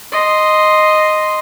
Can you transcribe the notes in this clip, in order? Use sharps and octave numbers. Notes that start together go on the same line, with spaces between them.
D#5 C6